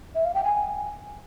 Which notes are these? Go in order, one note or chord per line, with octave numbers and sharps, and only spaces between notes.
E5
F5
G5
G#5